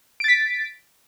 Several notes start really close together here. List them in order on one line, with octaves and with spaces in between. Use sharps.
D7 A6 B6